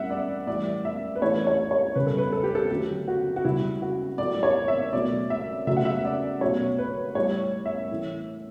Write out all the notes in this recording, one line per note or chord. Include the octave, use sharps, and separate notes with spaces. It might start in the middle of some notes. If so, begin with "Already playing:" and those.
Already playing: A2 G3 E5 F#5
D5
A2 E3 G3 D5
E5
B4
A2 E3 A3 C#5
C#5
C#5
C#3 G3 B4
A4
B4
A4
G4
A4
D3 F#3 A3 G4
F#4
F#4
C#3 G3 E4
F#4
A2 F#3 A3 D5
C#5
E5
B2 F#3 A3 D5
E5
C#3 F#3 A3 E5
F#5
E5
D5
B2 F#3 A3 C#5
B4
A2 G3 C#5
E5
A2 E3 A3